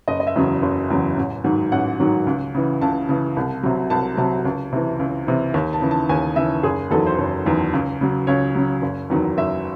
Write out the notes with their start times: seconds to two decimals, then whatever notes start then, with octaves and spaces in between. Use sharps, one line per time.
0.08 F#1 D#5
0.20 D#5
0.27 E5
0.36 E2 C#3 F#3
0.62 F#1
0.90 E2 C#3 F#3
1.17 A1
1.44 G#2 D#3 F#3
1.72 A1 F#5
2.00 G#2 D#3 F#3
2.27 C#2
2.55 C#3 E3
2.81 C#2 A5
3.09 C#3 E3
3.37 C2
3.63 C3 F#3
3.90 C2 A5
4.17 C3 F#3 A5
4.45 C#2
4.73 C3 E3
4.99 C#2
5.27 C3 E3
5.54 D#2
5.73 A5
5.82 C#3 E3
5.91 A5
6.09 D#2 G#5
6.36 C#3 E3 E5
6.63 F#1 G#4
6.91 E2 D#3 F#3 A4
7.07 C5
7.18 F#1 C#5
7.46 E2 D#3 F#3
7.73 C#2
8.01 C#3 F#3
8.27 C#2 C#5
8.55 C#3 F#3
8.82 F#1
9.10 E2 D#3 F#3
9.37 F#1 E5